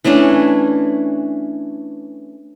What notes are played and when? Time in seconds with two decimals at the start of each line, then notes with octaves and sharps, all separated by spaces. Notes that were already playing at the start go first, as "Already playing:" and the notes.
0.04 E3 A3 C#4 D4